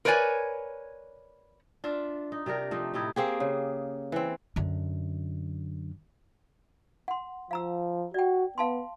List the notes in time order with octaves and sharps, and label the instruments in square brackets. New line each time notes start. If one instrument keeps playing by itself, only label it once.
[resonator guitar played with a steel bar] A#4 B4 C#5 D5 G#5
[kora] D4 F4 E5
D#4
C3 D4 G4 A#4
F3 A3 D#4
A2 C3 D#4 E4
A#3 C4 G4 G#4
C#3
E3 C4
[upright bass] F#2 D3
[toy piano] F#5 C6
[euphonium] F3 [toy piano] F5 A#5 E6
[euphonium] F#4 [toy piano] D5 G5
[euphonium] B3 [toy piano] F5 A5 C6